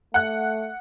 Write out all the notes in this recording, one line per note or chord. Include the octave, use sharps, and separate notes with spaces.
A3 F#5 F#6